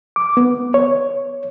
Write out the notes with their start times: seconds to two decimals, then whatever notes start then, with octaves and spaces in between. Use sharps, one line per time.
0.16 D6
0.37 B3
0.74 C#5